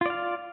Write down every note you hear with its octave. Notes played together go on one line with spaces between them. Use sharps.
F4 D5 F5